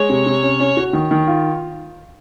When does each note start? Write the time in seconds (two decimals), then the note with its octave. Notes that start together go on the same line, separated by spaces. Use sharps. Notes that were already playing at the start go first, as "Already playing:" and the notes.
Already playing: G#3 C#5
0.09 C3
0.26 C3
0.43 C#4
0.60 C#4
0.77 F#4
0.93 D#3
1.11 D#3
1.27 F4